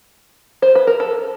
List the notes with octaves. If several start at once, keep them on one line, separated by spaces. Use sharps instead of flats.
C5
B4
A#4
A4